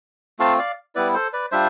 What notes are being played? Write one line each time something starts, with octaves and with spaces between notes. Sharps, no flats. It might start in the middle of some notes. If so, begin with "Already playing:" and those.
A3 C4 F4 F5 A5
D5 F5
G3 B3 E4 B4 D5
A4 C5
B4 D5
G3 D4 F4 C5 E5